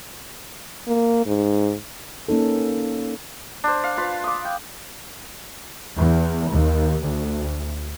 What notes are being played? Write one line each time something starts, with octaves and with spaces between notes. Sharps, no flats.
A#3
G#2
A#3 C#4 D#4 A4
D4 C5
F5
F4 B4
D6 D#6
G5
E2
D#2
D2